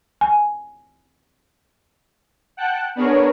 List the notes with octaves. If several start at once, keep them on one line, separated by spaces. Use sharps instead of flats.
G#5
F#5 G5 A5 F#6
B3 D4 G#4 A#4 C#5